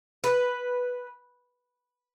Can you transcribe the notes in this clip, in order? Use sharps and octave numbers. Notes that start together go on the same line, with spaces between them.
B4